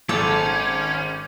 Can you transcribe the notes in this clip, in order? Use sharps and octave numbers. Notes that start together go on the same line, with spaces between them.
G#1 C#4 A4 D6